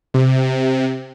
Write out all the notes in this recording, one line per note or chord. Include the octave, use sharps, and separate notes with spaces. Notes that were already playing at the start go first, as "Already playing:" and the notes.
C3